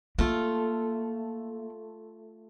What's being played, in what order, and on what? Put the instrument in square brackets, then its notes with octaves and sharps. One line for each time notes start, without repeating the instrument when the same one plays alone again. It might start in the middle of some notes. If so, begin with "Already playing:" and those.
[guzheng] A3 F4 [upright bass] A#3